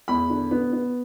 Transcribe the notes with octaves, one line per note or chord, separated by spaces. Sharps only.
E2 B5
D3
B3
B3